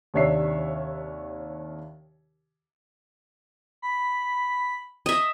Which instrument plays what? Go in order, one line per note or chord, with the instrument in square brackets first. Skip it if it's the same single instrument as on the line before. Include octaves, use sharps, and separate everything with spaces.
[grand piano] D#2 C3 D4 C#5 E5 C7
[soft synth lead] B5
[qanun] D#5 E5